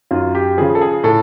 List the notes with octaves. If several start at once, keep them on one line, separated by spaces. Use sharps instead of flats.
F#2 F4
G4
C#3 F3 G#4
A4
G#4
A2 A4